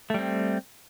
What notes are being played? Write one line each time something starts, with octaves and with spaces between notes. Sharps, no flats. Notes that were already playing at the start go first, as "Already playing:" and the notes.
G3 A3 C4